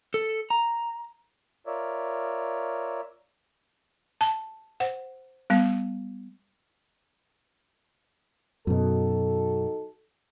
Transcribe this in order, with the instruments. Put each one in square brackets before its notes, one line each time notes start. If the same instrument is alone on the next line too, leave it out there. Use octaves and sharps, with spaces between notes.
[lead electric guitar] A4
A#5
[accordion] F4 A#4 C#5 D5 E5
[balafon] A5
C5 F#5
G3 B3
[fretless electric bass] F#2 B2 [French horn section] D#4 F#4 A4